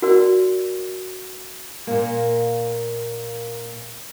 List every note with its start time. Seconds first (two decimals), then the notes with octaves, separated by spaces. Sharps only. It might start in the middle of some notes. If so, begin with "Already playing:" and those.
0.02 F#4 A#4 D5
1.87 A#2 A#3